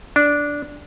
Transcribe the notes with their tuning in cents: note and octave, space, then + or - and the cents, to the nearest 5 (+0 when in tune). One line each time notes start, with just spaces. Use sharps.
D4 -10